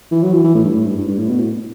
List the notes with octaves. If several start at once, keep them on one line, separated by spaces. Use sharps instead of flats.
E3
F#3
E3
E3
A2
G2
A2
G2
G2
G2
A2
B2
A2